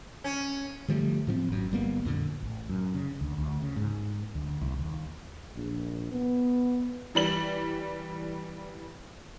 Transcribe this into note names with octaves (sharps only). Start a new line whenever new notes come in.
C#4
D3 F3 G3 A3
A2 F3 B3 C4
G#1 F#2
G1 G3 A#3 B3
F2 A#2 D3
A1
F#2
C#3
D2
D2
C#3
G#2
D2
C2
D#2
A#1
B3
E3 G3 F#7